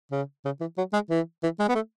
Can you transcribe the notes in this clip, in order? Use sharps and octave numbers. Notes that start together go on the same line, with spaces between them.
C#3
C#3
E3
F#3
G#3
E3
E3
G#3
B3
A3